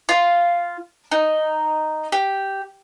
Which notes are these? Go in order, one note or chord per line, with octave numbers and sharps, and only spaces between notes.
F4
D#4
G4